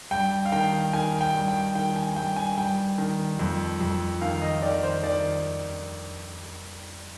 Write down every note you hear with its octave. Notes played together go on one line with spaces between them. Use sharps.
G2 G5
F5
D#3 G5
D#3 G#5
G5
G2
G5
D#3 G5
G#5
G2 G5
G#5
G2 G5
D#3
F2
F2
D#3 F5
D#5
D#3 D5
C5
D#3 D5